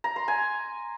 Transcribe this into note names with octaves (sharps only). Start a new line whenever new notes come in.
A#5
C6
G#5